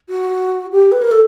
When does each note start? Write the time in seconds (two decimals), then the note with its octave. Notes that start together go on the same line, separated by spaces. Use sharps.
0.09 F#4
0.72 G4
0.92 B4
1.02 A#4
1.11 A4